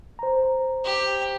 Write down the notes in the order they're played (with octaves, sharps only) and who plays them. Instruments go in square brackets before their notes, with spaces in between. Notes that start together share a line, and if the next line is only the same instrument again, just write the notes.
[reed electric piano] C5 A#5
[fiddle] G4